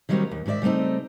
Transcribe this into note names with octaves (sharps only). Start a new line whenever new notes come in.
D#3 F#3 G3 A#3 C4 D#4
D#2
G#2 D#3 F#4 D5 E5
C#3 G3 A3 C4 D#4